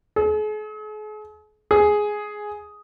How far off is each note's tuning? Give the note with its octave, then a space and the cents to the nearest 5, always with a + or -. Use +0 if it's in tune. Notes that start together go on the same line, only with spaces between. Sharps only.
G#4 +45
G#4 +5